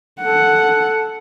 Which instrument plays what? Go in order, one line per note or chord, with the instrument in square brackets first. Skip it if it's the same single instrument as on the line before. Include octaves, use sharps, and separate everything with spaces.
[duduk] A4 [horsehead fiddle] F#5